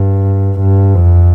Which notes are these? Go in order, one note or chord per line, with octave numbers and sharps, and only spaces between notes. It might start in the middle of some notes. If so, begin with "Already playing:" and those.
Already playing: G2
G2
F2